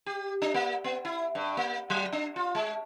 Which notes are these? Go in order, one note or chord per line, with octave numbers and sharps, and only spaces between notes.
G4
D4
A#3
B3
E4
G2
A#3
F#3
D4
F4
G#3